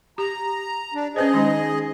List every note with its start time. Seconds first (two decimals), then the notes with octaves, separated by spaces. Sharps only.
0.18 G4 A#5
0.94 D4
1.16 C#4 G#4 B4 C5 D#5
1.34 D#3 G#3 D#4